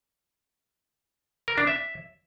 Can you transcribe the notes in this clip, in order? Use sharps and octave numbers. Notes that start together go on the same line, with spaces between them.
A#4
D4
E5